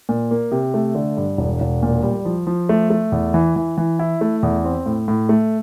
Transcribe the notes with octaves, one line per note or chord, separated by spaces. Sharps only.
A#2
A#3
C3
A3
D3
G2
E1
E1
A#2
G3
F3
F3
A3
A3
E2
E3
E3
E3
E4
A3
E2
C4
A2
A2
A3